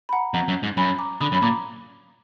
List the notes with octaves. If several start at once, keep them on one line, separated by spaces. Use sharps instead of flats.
B5
F#5 A#5
F2 F#5 A#5
F#2
G#2
F#2 G#5 B5
A#5 D6
D3 B5 D#6
F#2
B5
A#2 A#5 D6